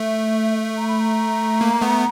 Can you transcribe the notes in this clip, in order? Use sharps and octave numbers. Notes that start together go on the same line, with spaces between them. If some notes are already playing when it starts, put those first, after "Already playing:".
Already playing: A3 E5
A#5
B5
A#5
A#3
A3 B3